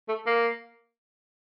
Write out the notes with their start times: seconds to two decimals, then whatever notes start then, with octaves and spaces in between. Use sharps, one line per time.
0.08 A3
0.26 A#3